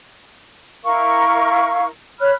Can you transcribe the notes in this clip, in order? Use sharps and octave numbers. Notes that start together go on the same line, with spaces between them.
E4 A#4 F5 C#6
C#5 B5 F6 F#6